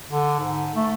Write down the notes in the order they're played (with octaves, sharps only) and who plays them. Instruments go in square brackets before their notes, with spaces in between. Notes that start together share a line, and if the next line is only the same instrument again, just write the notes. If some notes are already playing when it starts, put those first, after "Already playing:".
[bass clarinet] D3
G#2
A3